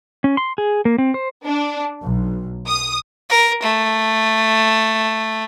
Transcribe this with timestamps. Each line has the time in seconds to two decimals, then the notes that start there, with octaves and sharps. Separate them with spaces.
0.24 C#4
0.37 C6
0.58 G#4
0.85 A#3
0.98 C4
1.14 C5
1.45 D4
2.03 B1
2.67 D#6
3.29 A#4
3.63 A3